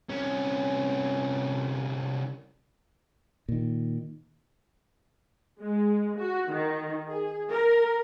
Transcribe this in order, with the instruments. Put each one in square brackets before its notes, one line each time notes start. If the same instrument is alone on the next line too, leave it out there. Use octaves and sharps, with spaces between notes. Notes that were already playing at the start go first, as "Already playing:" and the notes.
[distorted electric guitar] C2 C#4
[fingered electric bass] A#2 D#3
[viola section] G#3
F#4
D#3
G#4
A#4